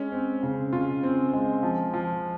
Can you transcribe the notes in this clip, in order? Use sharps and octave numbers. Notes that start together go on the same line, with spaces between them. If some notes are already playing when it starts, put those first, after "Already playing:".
Already playing: G#3 C#4
C4
C#3
C#3 F4
C4
G#3
F3
F3